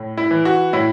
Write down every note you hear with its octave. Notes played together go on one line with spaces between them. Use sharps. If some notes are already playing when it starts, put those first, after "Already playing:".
Already playing: A2
E4
E3
F#4
A2 E4